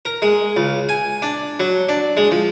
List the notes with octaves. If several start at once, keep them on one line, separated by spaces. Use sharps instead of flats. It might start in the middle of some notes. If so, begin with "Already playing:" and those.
A#4
G#3
C#2
G#5
D4
F#3
D4
G#3
F3